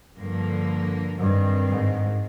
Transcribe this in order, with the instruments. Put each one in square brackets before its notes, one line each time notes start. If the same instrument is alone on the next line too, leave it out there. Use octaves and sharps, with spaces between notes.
[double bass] G2 [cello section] D3 F3 A#3
[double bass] G2 [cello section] D#3 G#3 C4
[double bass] G#2